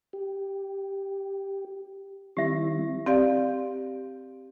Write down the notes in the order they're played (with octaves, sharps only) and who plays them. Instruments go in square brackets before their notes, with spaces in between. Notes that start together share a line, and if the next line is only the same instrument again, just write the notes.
[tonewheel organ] G4
[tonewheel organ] D#3 G3 C4 [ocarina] E4 [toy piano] G4 E5
[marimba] C4 G4 D5 F5